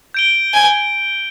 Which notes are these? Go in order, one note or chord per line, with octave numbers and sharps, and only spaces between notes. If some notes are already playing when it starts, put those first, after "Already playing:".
G6 D7 G7
G#5